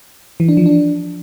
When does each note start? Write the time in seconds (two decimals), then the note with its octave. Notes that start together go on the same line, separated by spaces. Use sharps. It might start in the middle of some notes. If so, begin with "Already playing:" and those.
0.40 E3
0.49 D4
0.57 F3
0.66 D4